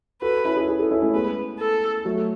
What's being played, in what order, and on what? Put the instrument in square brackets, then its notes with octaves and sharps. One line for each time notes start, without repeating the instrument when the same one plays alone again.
[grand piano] F#4 A4 [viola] B4
[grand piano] C#4 E4
E4 G#4
E4 G#4
F#4 A4
C#4 E4
A3 C#4
[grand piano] G#3 B3 [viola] B4
[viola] A4
[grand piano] F#3 A3